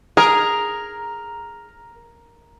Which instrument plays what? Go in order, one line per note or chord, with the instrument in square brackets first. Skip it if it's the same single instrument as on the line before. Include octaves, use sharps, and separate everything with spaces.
[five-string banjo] G#4 [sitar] A#4